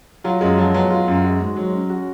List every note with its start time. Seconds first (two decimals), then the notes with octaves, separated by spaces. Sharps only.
0.24 F#3 F4
0.41 F#2 G#3
0.58 F3 F#3
0.74 F#3 B3
0.90 F4
1.08 F#2
1.24 G#3 F#4
1.41 G#2
1.56 F#3
1.73 C#4
1.90 F#4